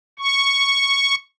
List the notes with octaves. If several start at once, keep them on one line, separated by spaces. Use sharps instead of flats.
C#6